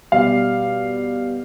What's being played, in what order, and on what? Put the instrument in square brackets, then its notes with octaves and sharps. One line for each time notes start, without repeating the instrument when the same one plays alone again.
[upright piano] B2 G3 F5